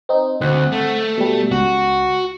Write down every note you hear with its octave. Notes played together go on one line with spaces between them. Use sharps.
C4 D#4
D2 C4 F#5
A3
B2 G3
C#2 F#4